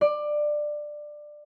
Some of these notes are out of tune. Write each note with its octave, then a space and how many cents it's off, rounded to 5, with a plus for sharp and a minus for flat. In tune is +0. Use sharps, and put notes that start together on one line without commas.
D5 +15